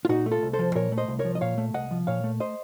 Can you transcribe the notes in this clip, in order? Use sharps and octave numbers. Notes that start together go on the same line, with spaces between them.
F4
A#2 D#4 F#4
A3
F4 A4
C2
A4 C5
F3
A#2 A#4 C#5
A3
C5 D#5
C2
A#4 C#5
F3
D#5
A#2 C#5 F5
A3
C2 D#5 F#5
F3
A#2 C#5 F5
A3
C5 D#5